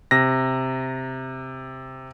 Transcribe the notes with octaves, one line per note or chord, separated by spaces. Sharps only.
C3 A#6